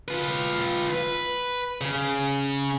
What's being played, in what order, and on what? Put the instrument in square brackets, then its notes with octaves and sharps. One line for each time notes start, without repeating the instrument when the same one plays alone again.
[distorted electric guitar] F4 B4
B4
C#3